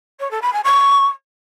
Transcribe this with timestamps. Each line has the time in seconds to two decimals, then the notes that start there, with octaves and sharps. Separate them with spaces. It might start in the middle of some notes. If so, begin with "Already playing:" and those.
0.20 C#5
0.31 A4
0.42 B5
0.53 G#5
0.64 C#6